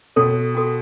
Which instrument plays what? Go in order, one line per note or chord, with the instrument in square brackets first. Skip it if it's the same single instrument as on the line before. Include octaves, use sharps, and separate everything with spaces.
[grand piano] B2 [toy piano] F#4 A4 C#5 G5
[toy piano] C#4 F#4 A4